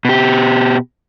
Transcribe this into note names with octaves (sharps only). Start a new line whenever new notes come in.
B2 G4